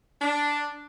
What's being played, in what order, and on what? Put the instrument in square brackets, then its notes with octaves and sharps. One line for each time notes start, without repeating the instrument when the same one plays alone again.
[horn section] D4